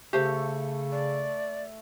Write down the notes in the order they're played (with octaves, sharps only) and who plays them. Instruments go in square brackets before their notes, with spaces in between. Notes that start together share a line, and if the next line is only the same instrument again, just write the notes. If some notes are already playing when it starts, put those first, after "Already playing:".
[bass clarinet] C#3 [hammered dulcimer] A3 A4 [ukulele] G4 C5 F5
[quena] D5